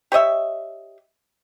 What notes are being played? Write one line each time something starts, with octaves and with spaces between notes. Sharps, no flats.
G4 C#5 D#5 E5